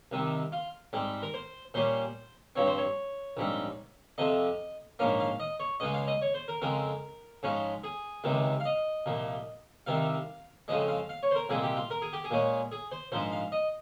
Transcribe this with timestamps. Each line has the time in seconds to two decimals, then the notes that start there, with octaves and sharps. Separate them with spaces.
0.12 C2 C3 D#3
0.52 F4
0.93 G#2 G3 C4
1.23 A#4
1.34 C5
1.74 A#2 G3 C#4 C5
2.56 G2 F3 C4 C#5
2.67 C5
2.78 C#5
3.37 A#1 G#2 G3 C4
4.18 F2 C3 F3 D#5
4.99 A#1 G#2 F3 A#3 C#4 F5
5.20 F5
5.40 D#5
5.60 C#5
5.80 C#2 C#3 G#3 D#5
5.94 F5
6.08 D#5
6.22 C#5
6.34 C5
6.48 A#4
6.62 F2 C#3 G#3 C4 A#4
7.43 G#2 F3 G#3 C#4
7.84 G#4
8.24 C#2 C3 D#3 G#3
8.60 F5
8.65 D#5
9.06 C2 A#2 F3
9.86 C2 C3 D#3 F5
10.68 F2 C#3 F3 G#3 D#5
10.88 F5
11.09 F5
11.23 C#5
11.31 C5
11.35 A#4
11.49 C2 A#2 G#3 C4 G#4
11.63 G4
11.76 F4
11.90 A#4
12.02 G#4
12.13 G4
12.24 G#4
12.31 A#2 G#3 C#4
12.72 G#4
12.92 C5
13.12 A#1 G#2 F3 G#3 C5
13.32 F5
13.52 D#5